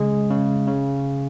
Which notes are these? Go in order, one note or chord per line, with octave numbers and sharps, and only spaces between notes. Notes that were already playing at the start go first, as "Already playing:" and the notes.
Already playing: C#3 G#3 G#4
C#3
C#3